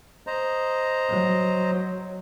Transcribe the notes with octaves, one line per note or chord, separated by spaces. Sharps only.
C5 D#5 A#5
F#3